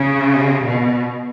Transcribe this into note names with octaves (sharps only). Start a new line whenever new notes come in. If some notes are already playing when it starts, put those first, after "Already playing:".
Already playing: C#3
B2